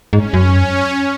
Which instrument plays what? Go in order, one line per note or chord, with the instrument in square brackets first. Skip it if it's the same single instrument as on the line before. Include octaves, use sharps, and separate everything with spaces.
[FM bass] G#2 [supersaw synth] C#4
[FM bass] F#2
[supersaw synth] C#4